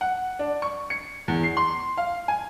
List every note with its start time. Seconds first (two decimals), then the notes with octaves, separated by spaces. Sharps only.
0.01 F#5
0.39 D4
0.62 C#6
0.90 C#7
1.28 E2
1.43 C7
1.57 C6
1.97 F5
2.28 G#5